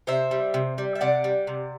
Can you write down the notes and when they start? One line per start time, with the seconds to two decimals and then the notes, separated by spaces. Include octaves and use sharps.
0.07 C3 C5 E5
0.31 G3
0.54 C3
0.78 G3
0.95 E5
1.01 C3 D5 F#5
1.24 G3
1.47 C3